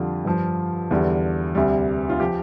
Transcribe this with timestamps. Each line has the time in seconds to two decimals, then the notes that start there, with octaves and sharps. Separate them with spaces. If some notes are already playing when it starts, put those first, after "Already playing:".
Already playing: F2 D3 G3 F4
0.25 G2 F3
0.91 E2 D3 G3
1.55 D2 C3 G3
2.10 F4
2.20 F3 G4